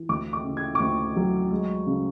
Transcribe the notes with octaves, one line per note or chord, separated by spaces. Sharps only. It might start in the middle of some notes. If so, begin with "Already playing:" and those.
Already playing: E3
D2 D6
D6
C#3
G#6
D6
D2 C#6
F#3
G#3
C#3